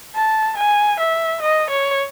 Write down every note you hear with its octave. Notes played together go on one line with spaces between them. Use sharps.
A5
G#5
E5
D#5
C#5